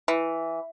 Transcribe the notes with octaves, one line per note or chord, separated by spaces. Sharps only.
E3